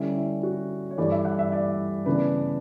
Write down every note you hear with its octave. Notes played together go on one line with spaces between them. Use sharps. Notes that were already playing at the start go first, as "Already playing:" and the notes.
Already playing: D3 G3 C#4 E4
E4
F#4
C#5
G2 E3 A3 D5
E5
F#5
E5
D5
C#3 E3 B3 D4 B4